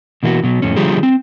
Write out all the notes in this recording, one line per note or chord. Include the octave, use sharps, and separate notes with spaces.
B2 E3 A#3 E4 F#4
B2 F#3
F2 A2 C#4
D3 F3 G3 F4 G4 G#4
C4